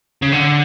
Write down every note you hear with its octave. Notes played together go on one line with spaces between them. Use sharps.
C#3
D3